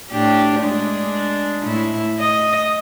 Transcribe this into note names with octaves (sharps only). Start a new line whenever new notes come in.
A2 D4 G4
G#3 D4
A2 E4
D#5